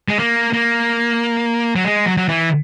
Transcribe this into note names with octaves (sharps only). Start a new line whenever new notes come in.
G#3
A#3
A#3
F#3
G#3
F#3
F#3
E3